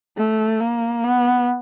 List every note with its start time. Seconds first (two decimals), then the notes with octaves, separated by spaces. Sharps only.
0.17 A3
0.60 A#3
1.04 B3